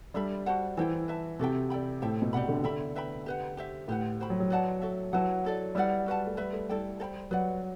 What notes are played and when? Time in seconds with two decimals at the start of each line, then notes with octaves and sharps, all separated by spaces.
0.14 G3 D4 A4 E5 B5
0.46 F#4 C5 F#5 A5
0.77 E3 E4 A4 C5 G5
1.08 B4 E5 A5
1.39 C3 F#4 A4 E5 G5
1.70 A4 D5 G5 B5
2.02 A2 A4 C5 E5 G5
2.22 B2
2.33 C3 G4 D5 F#5 B5
2.48 D3
2.64 D3 A4 E5 G5 B5
2.95 B4 E5 G5 B5
3.26 G4 B4 F#5
3.57 G4 C5 E5
3.88 A2 G4 B4 F#5
4.20 F#4 C5 G5 B5
4.30 F#3
4.40 F#3
4.50 B4 D5 F#5 A5
4.82 F#4 A4 E5
5.13 F#3 E4 B4 F#5 A5
5.45 E4 A4 D5
5.75 G3 E4 B4 D5 F#5
6.06 F#4 B4 F#5 A5
6.26 A3
6.37 G3 B4 E5 B5
6.53 A3
6.69 G3 E4 A4 D5 G5
7.00 A4 C5 G5 B5
7.31 F#3 B4 D5 F#5